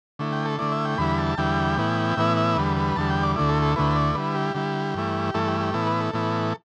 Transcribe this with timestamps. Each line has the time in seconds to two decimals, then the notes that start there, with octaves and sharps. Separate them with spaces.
0.19 D3 A3 E4
0.32 G5
0.46 A4
0.58 D3 A3 E4 D5
0.72 E5
0.85 G5
0.98 E2 D3 G3 E4 B5
1.18 A5
1.38 E2 D3 G3 E4 G5
1.78 A2 E3 B3 E4
2.17 A2 E3 B3 E4 E5
2.37 E5
2.57 E2 D3 G3 B4
2.77 B4
2.96 E2 D3 G3 A5
3.10 G5
3.23 D5
3.36 D2 D3 A3 E4 D5
3.49 A4
3.62 A4
3.76 D2 D3 A3 E4 B4
3.96 D5
4.15 D3 G3 E4 B4
4.35 G4
4.55 D3 G3 E4
4.94 G2 E3 A3 E4
5.34 G2 E3 A3 E4 A4
5.48 G4
5.61 G4
5.74 A2 E3 B3 E4 A4
5.87 B4
6.00 A4
6.14 A2 E3 B3 E4